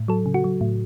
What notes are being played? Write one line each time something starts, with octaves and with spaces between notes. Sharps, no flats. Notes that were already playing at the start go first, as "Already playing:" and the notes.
Already playing: A2
F#3 A4
C#3
F#4
F#3
A2